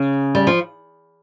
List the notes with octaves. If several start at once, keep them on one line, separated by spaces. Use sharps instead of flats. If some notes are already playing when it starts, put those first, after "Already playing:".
Already playing: C#3
G3
F3